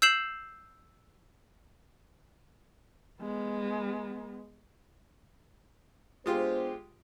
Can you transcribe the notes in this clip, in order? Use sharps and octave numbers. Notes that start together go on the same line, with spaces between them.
E6 G6 C7 E7 F#7
G#3 B3
G#3 B3 D4 F4 G4 C5